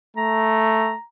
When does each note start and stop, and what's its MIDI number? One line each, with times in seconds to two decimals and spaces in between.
0.16 0.95 57
0.16 1.03 82